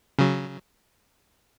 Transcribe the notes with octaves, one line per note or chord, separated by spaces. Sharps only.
C#3 F#3